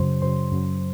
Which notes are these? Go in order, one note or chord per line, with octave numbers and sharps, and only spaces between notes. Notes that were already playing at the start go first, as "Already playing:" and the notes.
Already playing: F#2 C#3 F#3 C5 C6
F#2 C#3 F#3 C5 C6
F#2 C#3 F#3